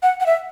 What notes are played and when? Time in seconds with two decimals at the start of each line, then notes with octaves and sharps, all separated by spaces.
0.03 F#5
0.20 F#5
0.26 E5